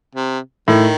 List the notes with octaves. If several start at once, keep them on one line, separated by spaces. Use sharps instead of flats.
C3
A2 D#3